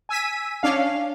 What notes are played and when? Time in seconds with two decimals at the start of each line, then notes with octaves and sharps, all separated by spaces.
0.09 G#5 E6 B6 D#7
0.63 C#4 D4 F5